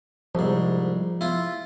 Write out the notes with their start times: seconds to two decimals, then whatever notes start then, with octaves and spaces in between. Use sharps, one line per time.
0.35 C2 G#2 F3
1.21 E4 F4